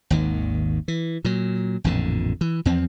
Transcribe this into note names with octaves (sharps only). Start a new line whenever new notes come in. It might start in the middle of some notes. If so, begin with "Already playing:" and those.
G#1 D#2 D#3
E3
A#2 F#3
A1 F2 A#2 D3
E3
E2 F3 C4